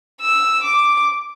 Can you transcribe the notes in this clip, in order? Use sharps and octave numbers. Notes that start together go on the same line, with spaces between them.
E6
D6